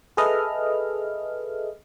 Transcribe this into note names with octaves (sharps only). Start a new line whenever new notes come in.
G#4 A4 B4 D#5 E5 F6